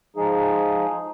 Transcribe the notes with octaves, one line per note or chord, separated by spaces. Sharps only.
F3 G#3 D#4 G#4